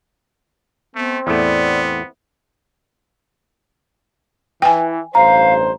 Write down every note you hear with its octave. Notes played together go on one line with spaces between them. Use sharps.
A3 B3 C4
E2 A2 A3 B3 D5
E3 G5 G#5
A1 G2 C5 F5 A#5